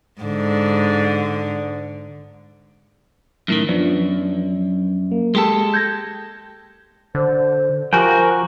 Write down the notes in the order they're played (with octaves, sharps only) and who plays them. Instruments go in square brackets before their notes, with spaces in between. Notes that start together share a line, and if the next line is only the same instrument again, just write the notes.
[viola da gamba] G#2 D3
[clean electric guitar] F#2 A2 D#3
[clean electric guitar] F#2 [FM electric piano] F3 B3 D4
[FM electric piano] A#3
[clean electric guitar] G#3 G4 A4
[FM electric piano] G6 G#6 A#6
[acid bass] D3 [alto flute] C5
[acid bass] F3 [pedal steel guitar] F#4 A#4 G5 [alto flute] G4 [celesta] G#5